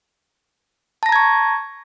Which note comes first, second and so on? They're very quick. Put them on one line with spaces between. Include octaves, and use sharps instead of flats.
A5 A#6 A#5 G#6 C#6